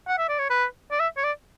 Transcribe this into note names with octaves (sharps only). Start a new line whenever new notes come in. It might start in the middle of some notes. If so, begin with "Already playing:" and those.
F#5
E5
D5
C#5
B4
D5
E5
C#5
D5